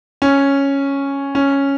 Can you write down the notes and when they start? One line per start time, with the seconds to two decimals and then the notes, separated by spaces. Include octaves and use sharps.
0.22 C#4
1.35 C#4